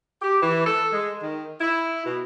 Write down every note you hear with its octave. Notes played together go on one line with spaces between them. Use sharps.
G4
E3
A4
G#3
D#3
E4
B2